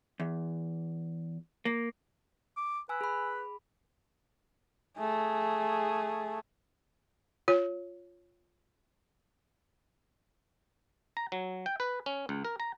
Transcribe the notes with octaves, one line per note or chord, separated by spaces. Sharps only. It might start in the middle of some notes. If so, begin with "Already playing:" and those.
E2
A#3
D6
B4 G#5 E6
G#4 B5
A3 G#4
F4 C#5
A#5
F#3
G5
B4
C#4
C#2
A#4
A#5